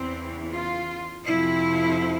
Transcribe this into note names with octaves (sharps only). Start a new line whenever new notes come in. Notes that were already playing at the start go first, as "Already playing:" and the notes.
Already playing: E2 C#3 E3 C4
F4
F2 C3 F3 E4